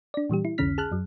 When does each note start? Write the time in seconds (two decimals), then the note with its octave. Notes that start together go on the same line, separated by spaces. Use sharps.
0.14 D4 D5
0.30 A#2 E3 G3 G4
0.45 E4
0.58 C2 F2 D3 C#4 F6 B6
0.78 G#4 A5 F6 F#6
0.92 F#2 F#3